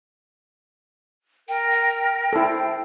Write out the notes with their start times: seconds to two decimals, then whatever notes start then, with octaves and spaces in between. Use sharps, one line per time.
1.48 A#4 G5
1.71 G5
2.33 E4 A4 C5